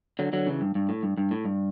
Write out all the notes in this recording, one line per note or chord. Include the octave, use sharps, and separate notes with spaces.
D3 F#3
D3 F#3
C#3 E3
G2
G2
A2
G2
G2
A2
G2